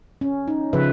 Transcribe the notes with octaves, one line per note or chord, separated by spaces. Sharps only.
C#4
D#4
C#3 F3 B4 E5